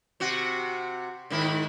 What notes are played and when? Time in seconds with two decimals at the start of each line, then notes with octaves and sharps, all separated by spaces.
0.20 C3 F#4
1.30 G#2 D#3 E4